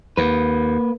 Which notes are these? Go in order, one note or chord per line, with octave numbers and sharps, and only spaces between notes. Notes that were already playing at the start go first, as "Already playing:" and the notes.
D#2 A#3 B4